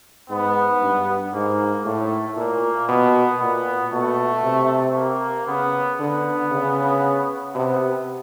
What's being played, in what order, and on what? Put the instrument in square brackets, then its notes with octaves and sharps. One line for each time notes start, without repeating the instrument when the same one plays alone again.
[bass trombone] G#2 [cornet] B3
[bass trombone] G2
[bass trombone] G#2 [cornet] A#3
[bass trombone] A2 [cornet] A3
[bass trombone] A#2 [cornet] A#3
[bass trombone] B2 [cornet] B3
[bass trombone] A#2 [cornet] B3
[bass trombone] B2 [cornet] A3
[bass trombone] C3
[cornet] A#3
[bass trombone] C#3 [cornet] B3
[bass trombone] D3 [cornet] B3
[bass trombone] C#3
[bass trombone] C3 [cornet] B3